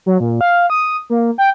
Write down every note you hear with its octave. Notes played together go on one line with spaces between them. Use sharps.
F#3
A#2
F5
D#6
A#3
G5